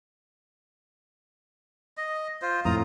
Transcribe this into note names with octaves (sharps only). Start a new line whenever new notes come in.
D#5
F4 C5
F2 A2 F4 A#5 D#6